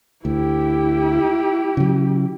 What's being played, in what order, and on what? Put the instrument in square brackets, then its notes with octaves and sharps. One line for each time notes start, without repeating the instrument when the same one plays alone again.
[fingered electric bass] D2 [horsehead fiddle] E4 G4
[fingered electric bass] C#3 F#3